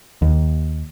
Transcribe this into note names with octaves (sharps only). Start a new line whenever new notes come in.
D#2